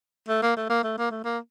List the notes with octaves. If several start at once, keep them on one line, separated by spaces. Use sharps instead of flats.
A3
A#3
A3
A#3
A3
A#3
A3
A#3